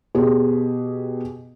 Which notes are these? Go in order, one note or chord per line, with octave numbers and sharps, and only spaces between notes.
B2 G4 G#4